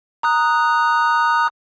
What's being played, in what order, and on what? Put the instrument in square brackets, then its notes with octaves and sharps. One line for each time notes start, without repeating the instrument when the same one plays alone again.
[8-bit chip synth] A#5 D#6 F#6